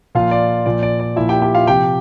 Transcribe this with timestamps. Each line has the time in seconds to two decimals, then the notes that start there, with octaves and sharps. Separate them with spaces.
0.15 A#2 F3 F4 F5
0.31 D5
0.66 A#2 F3 D5
0.83 D5
1.00 D5
1.16 A#2 F3 E4 E5
1.29 G4 G5
1.42 G4 G5
1.55 F4 F5
1.67 C3 F3 G4 G5